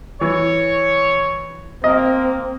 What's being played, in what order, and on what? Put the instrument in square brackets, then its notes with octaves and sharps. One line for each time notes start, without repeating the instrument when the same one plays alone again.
[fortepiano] E3 [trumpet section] C#5
[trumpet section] A#3 [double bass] C4 [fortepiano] D#5